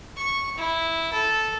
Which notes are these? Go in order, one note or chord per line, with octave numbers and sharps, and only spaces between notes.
C#6
E4
A4